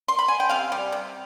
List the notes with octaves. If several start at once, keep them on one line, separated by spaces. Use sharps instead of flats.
C6
B5
G#5
G5
C3 F5
G3
C3